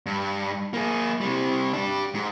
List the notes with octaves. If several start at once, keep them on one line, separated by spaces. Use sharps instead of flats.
G2
A#3 G#4
C3 G3
D4 G4
G#2